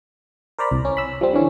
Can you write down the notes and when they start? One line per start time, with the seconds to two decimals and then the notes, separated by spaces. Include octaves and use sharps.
0.59 A#4 C5 D5 A#5 B5
0.71 C2
0.85 C#4
0.97 B5 E6
1.21 F3 G3 C4
1.33 D3 E3 C#4